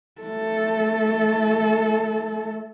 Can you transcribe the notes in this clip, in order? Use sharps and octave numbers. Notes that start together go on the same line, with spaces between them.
A3 A4